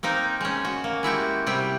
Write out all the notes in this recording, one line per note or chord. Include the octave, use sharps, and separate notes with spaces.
A#3 C4 D#4 A#4
G#3 C#4
F#4
A#3
G#3 E4 F#4 G4
C3 G3 E4 G4